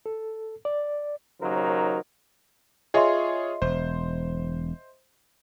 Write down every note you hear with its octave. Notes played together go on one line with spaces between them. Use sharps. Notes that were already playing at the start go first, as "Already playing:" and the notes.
A4
D5
D#2 C#3 F#3 D#4 A#4 C5
F4 G#4 C#5 D#5 E5 C6
E1 C5